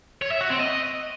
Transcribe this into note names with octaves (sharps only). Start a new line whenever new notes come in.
C#5
E5
F#4
C4
D#5